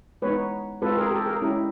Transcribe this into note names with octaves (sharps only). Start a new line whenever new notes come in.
G#3 B3 D#4 B4 C#5
G#3 C4 F4 A4 B4
G#4 A#4
G4 A4
G#4 A#4
G#3 C#4 E4 G4